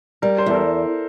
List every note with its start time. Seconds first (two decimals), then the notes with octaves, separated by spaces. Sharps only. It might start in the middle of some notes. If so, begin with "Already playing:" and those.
0.22 G3 A#4
0.38 C5
0.46 E2 A4
0.54 A#4